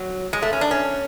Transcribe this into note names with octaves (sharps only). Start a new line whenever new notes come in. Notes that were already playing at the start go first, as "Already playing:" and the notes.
Already playing: F#3
G#3
A3
C#4
D4
C#4